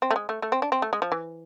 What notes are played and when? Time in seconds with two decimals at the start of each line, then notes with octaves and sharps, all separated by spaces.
0.02 C4
0.11 A3
0.16 G#3
0.29 A3
0.42 A3
0.52 C4
0.62 D4
0.72 C4
0.82 A3
0.93 G#3
1.02 F3
1.12 E3